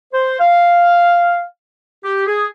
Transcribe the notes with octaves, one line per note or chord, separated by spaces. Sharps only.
C5
F5
G4
G#4